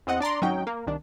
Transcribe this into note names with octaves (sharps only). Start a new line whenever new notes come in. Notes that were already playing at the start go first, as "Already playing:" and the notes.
E2 C4 D#5 F#5
D4 D5 A#5 C6
G#1 F#3 C#4 D#4 G5
A#3
C2 D#3 D4